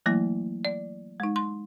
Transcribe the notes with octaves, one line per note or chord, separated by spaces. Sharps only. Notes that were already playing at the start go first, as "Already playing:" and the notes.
E3 F#3 A3 A#3 E4
D5
G#3 D#4
C6